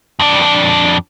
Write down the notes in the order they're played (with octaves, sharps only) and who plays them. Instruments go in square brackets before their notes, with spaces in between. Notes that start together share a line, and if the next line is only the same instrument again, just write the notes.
[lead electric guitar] F2 D4